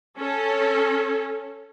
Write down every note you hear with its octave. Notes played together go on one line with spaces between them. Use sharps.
C#4 A4